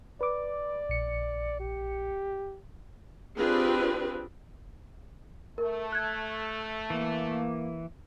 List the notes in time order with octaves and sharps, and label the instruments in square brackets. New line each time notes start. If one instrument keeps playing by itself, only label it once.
[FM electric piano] B4 D6 [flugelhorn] D5
[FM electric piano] A#1 C#7
[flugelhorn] G4
[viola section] C4 D4 F4 G4 G#4 B4
[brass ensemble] A3 [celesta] A#4
[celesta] F#6 G#6
[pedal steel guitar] E3 [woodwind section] A#3